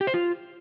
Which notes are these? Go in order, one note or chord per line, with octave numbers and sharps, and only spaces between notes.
G4
C5
F4